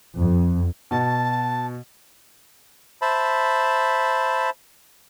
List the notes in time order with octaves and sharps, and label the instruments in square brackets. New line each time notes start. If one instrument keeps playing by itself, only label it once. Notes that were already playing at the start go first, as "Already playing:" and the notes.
[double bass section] F2
[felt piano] B2 F#4 [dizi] A5
[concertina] C5 E5 A5 B5